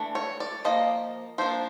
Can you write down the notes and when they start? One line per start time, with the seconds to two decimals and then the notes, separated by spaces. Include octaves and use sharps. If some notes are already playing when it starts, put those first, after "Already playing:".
Already playing: E3 A3 D4
0.15 C#5
0.40 D5
0.65 F3 A#3 D#5
1.38 F3 A#3 D4 C5